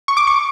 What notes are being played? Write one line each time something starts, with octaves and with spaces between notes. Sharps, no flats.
C#6
D6
C#6